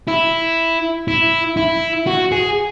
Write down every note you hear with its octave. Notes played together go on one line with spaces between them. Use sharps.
E4
E4
E4
F#4
G#4